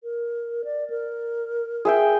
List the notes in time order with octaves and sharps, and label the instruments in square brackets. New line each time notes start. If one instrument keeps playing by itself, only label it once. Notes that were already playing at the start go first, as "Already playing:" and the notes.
[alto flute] A#4
D5
A#4
[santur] G#4 E5 G5